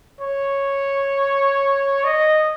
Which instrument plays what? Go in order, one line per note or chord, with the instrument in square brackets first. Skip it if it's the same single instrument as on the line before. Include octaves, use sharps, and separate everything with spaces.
[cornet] C#5
D#5